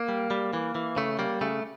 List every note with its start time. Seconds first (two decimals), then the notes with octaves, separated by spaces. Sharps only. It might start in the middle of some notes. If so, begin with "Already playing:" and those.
Already playing: A#3
0.08 G3
0.31 G3
0.53 E3
0.75 E3
0.96 C#3 A3
1.19 G3 A#3
1.41 C#3 A3